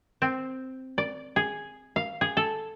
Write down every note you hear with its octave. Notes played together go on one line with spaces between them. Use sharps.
C4
D5
G#4
F5
G#4
A4